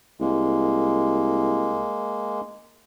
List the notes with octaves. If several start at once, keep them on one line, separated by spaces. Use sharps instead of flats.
C2 G#3 A#3